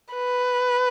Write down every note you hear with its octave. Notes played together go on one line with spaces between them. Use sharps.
B4